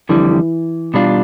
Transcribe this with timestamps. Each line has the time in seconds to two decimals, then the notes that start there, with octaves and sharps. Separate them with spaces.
0.09 F2 D3 E3 G3
0.30 E3
0.94 B2 G3 D4 F4